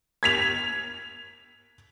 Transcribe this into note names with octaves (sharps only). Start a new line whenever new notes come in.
G#6 B6 F7